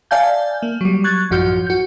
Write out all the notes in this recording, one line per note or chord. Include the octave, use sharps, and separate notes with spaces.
D5 E5 F5 G#5 A5 G6
A#3
F#3 G3
C#6 F#6 G#6 A6
A1 F#2 F3 F#4 F6 G6
F#4 G6